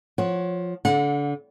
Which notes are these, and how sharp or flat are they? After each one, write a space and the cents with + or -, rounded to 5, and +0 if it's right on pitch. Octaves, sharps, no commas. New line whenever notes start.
F3 +15 C#5 +0 F#5 +0
D3 -30 F#5 -30